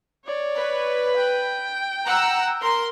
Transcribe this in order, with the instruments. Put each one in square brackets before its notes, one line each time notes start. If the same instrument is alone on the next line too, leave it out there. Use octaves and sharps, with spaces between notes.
[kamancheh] C#5 D5
[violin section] B4
[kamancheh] G5
[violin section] F#5 A#5 E6
A#4 C6